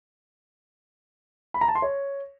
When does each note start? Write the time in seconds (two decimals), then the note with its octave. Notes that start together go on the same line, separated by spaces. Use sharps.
1.54 B5
1.61 A#5
1.68 A5
1.75 C6
1.82 C#5